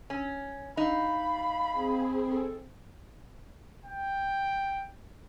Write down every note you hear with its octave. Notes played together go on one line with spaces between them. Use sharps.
C#4
D#4 F5 B5
C4 G#4
A4
G5